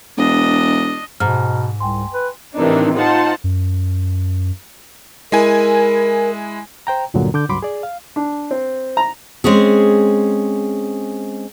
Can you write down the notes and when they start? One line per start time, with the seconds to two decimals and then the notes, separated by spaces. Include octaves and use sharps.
0.17 E1 D4 D#5
1.20 G#2 B2 G#5 A#5 F6
1.80 C2 G5 G#5 C6
2.14 B4
2.55 A2 C3 D#3 E3 D4 D#4
2.94 D#4 F4 C5 F#5 A5
3.44 F#2
5.32 G#3 E4 A#4 G#5
6.87 C5 G5 A#5
7.14 D2 G2 A#2 D3 F#3
7.34 D3 D6 G6
7.49 C#2 G2 F#3 B5 C6 D6
7.62 G#4 D5
7.83 F5
8.16 D4
8.51 C4
8.97 A#5
9.44 G#3 C4 C#4 G#4